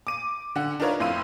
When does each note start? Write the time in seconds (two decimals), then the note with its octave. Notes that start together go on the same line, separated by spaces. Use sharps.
0.07 D6 D#7
0.56 D3 F#5
0.80 D4 D#4 F4 A#4 B4 C#5
1.00 F2 A2 F5 C6 E6 D#7